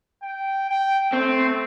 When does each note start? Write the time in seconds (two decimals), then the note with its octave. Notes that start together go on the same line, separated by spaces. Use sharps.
0.23 G5
0.69 G5
1.13 A3 C4